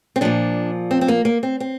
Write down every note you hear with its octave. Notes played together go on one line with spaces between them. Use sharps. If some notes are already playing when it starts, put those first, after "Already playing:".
C4
A#2 F3 D4
C4
C4
A#3
A#3
C4
C4